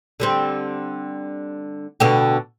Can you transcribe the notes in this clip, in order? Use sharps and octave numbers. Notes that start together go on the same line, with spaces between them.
D3 G3 C4
B2 D3 G4